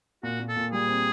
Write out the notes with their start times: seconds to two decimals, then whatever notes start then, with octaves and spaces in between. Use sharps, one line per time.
0.23 A#2 F#4
0.40 A#2
0.48 A4
0.56 A#2
0.72 G3 G#4
0.88 C4